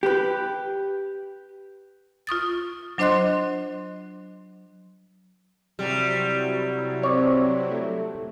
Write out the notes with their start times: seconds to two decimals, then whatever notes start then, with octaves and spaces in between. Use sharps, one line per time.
0.03 G4 B4
2.27 F4 C#6 D#6 A6
2.98 F#3 D4 C5 D#5 C6 F#6
5.79 C3 F#3 G3 E4
7.03 C4 C#5 D5
7.71 A3